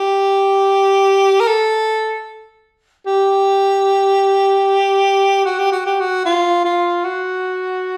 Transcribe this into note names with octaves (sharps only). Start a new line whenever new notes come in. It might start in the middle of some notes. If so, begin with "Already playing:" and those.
Already playing: G4
A#4
A4
G4
F#4
G4
F#4
G4
F#4
F4
F4
F#4